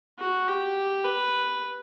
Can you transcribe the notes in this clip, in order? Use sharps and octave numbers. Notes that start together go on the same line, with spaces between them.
F#4
G4
B4